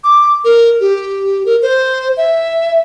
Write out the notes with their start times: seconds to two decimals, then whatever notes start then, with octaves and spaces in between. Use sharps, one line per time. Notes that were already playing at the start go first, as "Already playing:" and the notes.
0.04 D6
0.45 A#4
0.81 G4
1.46 A#4
1.62 C5
2.17 E5